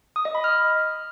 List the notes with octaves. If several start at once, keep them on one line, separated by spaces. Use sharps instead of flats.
D#6
D#5
B5
F6